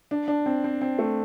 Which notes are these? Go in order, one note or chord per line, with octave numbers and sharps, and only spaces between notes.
D4
D4
C4
C4
C4
A3